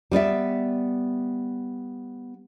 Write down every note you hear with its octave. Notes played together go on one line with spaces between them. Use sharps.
G3 B3 D5 E5